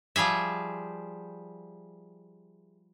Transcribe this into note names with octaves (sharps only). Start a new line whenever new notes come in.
F3 G3 G#4 E5